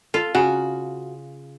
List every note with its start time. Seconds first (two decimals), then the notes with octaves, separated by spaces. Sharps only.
0.14 F4 A4
0.35 C#3 F#4